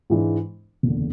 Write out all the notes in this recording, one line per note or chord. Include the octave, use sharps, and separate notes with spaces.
G#2 E3 G#3 D4
F#1 E2 D3